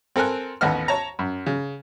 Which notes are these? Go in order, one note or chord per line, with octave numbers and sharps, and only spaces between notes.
C4 A4 A#4 G#5 F#6
A1 D#2 B3 D#5 F#5 F6
C#5 A5 A#5
F#2
C#3